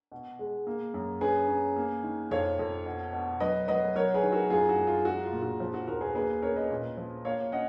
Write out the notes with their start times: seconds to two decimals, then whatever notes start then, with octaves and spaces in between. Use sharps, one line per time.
0.12 B2
0.39 G#3
0.67 A#3
0.94 F#2
1.21 C#4 G#4 B4
1.48 C#4
1.76 A#3
2.03 D#3
2.31 F2 C#5 F5
2.59 F2
2.86 B2
3.13 B2
3.40 F#3 B4 D#5
3.68 F#3 B4 D#5
3.96 F#3 A#4 C#5
4.14 G#4 B4
4.23 D#3
4.32 F#4 A#4
4.50 F#2 F4 G#4
4.69 F#4
4.78 F#2
4.87 F4
5.05 G#3 F#4
5.24 F4
5.32 A#2
5.42 F#4
5.60 F3
5.74 F#4
5.87 D#2 F#4 A#4
6.01 G#4 B4
6.15 A#3 G#4 B4
6.42 C#4 A#4 C#5
6.56 B4 D#5
6.70 A#2
6.97 F3
7.25 A#3 C#5 F5
7.52 C#4 D#5 F#5